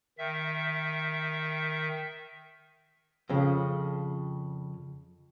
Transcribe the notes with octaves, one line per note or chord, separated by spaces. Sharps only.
D#3 E5
F2 C#3